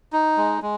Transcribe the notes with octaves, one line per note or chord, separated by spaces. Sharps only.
D#4
G#3
G#3